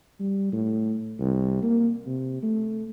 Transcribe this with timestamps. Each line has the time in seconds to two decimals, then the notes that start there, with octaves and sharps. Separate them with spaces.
0.20 G3
0.53 A2
1.20 C2
1.63 A#3
2.06 C3
2.43 A3